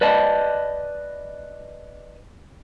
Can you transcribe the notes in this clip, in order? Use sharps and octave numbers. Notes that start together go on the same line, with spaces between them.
B4 D5 D#5 A5